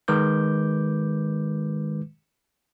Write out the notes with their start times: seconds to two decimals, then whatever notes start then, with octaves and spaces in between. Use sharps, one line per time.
0.08 D#3 G#3 B4 D6 G6